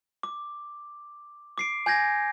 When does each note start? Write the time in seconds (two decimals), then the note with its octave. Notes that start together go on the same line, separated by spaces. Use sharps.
0.23 D6
1.58 D6 C7 D7
1.86 G#5 G6 G#6 A#6